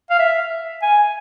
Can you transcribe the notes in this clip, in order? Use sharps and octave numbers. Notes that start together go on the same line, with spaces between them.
F5
E5
G#5